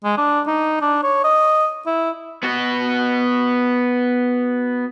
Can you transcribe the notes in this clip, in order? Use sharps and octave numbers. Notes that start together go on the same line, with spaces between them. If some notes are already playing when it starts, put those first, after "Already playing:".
G#3
D4
D#4
D4
C#5
D#5
E4
B3 F#4